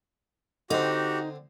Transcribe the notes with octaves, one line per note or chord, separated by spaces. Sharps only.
D3 C4 D#4 F#4 G4